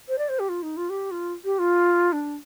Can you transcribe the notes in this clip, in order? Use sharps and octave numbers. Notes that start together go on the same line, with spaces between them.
C5
D5
C5
G4
F4
D#4
F4
G4
F4
G4
F4
D4